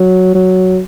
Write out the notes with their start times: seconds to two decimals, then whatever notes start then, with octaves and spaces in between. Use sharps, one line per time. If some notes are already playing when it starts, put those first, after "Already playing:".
Already playing: F#3
0.34 F#3